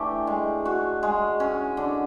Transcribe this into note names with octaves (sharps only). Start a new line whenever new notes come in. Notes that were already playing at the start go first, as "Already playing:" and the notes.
Already playing: E3 A3 D4 G4
G#3
F#4
G#3
C#4
D3